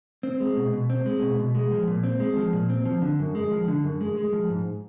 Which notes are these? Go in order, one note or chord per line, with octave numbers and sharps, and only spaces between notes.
C4
G#3
B2
B2
C4
G#3
B2
B2
G#3
F3
A#2
C4
G#3
F3
A#2
C4
F3
D3
F#2
G#3
F3
D3
F#2
G#3
G#3
F3
G#2